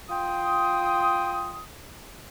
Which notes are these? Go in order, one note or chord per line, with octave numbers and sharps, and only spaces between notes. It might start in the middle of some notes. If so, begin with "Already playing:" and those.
F4 G5 C6 D#6